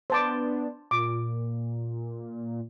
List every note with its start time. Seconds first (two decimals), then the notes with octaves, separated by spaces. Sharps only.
0.10 B3 D4 C5 A5 D6
0.91 A#2 D6